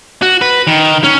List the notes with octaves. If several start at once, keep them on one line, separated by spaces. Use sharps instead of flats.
F#4
B4
D#3
C#4